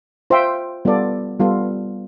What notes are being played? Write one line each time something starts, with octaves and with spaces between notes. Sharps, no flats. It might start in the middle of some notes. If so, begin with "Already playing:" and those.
F4 C5 E5 G5
G3 B3 F4 A4 D5
G3 B3 F4 A4